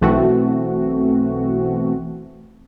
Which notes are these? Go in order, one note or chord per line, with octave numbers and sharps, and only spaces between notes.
B1 E3 A3 C4 F#4